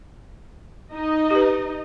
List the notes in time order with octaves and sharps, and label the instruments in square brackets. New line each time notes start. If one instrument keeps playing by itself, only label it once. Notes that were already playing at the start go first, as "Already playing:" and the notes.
[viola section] D#4 D#5
[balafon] G4 B4